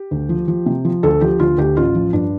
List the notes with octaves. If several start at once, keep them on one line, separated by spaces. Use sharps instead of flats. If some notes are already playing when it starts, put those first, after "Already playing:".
Already playing: G4
D2
F3
F3
C3
F3
D2 A4
F3 G4
D2 F4
D2 G4
A1 F4
F3
G2 D4